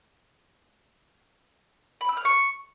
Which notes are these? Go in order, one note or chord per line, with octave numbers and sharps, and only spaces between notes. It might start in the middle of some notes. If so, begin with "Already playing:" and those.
B5
E6
F6
C#6